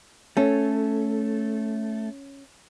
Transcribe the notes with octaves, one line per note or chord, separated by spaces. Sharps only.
A3 C#4 A4